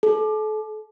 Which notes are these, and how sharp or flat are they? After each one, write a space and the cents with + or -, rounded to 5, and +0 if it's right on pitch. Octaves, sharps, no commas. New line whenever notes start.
A4 -35